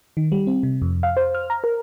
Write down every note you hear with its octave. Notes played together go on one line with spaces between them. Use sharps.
D#3
G3
C4
C3
F2
F5
C5
F6
A#5
A#4